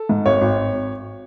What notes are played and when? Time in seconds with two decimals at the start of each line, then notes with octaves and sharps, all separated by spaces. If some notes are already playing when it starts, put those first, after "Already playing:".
Already playing: A4
0.09 G#2
0.25 G#1 C#5
0.41 G#1